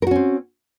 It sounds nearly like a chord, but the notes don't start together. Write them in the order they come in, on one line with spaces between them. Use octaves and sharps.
A#4 F#4 C#4 C4